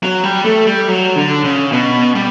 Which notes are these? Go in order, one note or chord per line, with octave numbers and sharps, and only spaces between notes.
F#3
G3
A3
G3
F#3
D3
C#3
B2
G3